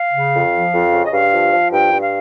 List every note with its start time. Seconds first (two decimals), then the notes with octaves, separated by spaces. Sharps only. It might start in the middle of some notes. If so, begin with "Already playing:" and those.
Already playing: F5
0.13 C#3
0.33 F2
0.53 F3
0.73 F2
0.93 C#3
1.05 D#5
1.12 G2 F5
1.32 F3
1.52 F3
1.71 G2 G5
1.92 G2
2.01 F5